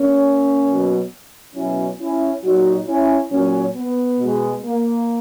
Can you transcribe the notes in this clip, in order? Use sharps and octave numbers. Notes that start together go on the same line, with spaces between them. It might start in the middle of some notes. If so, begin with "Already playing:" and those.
Already playing: A#3 C#4
B2 F#3
B2 F#3 C#4 E4
C#4 E4
A#2 F#3 D#4 F#4
C#4 E4
A#2 F#3 A#3 C#4
B3
B2 G#3
A#3